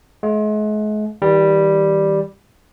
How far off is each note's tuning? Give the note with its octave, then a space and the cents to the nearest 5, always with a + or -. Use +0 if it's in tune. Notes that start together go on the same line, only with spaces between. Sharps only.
G#3 +40 F5 +30
D#3 +45 G3 +0